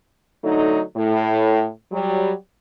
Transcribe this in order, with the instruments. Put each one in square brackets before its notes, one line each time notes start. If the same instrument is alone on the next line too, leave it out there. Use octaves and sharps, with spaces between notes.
[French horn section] D3 F#3 A3 D#4
A2
F#3 G3